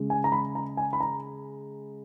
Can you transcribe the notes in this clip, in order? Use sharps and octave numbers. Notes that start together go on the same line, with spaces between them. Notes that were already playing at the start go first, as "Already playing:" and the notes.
Already playing: C#3 G#3
G#5
A#5
B5
A#5
G#5
B5
A#5